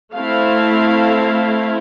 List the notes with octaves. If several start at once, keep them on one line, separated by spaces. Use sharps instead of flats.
A3 C4 E4 F5